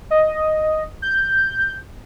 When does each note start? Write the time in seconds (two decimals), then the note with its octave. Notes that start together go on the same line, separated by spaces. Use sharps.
0.11 D#5
1.02 G6